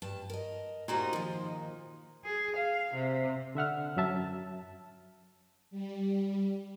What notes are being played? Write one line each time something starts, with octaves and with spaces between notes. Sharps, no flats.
G2 A5
A#4 D#5
A#2 D#3 D#4 F#4 G4 C5
D#3 F3
G#4
F5
C3
D3 E5 F#5 F6
F#2 F#3 E5 A5
G3